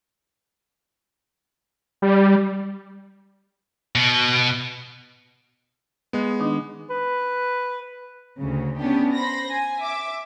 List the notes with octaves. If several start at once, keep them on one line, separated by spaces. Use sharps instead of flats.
G3
B2
G#3 B3
D#3 D4 D#4
B4
D2 C#3
B3 C#4 D4 G4
C5 B5 A#6
G#5
E5 D6